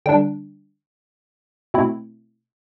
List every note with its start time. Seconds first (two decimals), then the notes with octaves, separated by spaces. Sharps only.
0.06 D3 G3 D4 G5
1.74 B2 A3 C4 E4